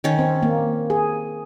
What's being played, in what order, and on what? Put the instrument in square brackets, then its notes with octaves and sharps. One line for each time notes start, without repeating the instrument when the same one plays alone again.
[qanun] D#3 C#4
[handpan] C4
A#3
G#4